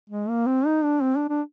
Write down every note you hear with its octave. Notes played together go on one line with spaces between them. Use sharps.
G#3
A#3
C4
D#4
D4
C4
D4
D4